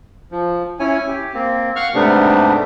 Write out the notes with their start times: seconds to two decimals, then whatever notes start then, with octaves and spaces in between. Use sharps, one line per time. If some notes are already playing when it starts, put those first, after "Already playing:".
0.31 F3
0.80 C#4 E4 C#5 G#5
1.08 G4
1.34 A#3 C4
1.76 F5 F#5 C#6 F6
1.94 G#2 C3 G3 A3 B3 D4